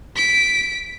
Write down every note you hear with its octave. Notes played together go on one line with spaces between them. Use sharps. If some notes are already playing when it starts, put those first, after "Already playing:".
B6 D7